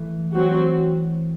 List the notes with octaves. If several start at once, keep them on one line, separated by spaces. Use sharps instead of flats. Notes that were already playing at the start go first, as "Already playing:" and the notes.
Already playing: E3 A3
F#3 C4 F#4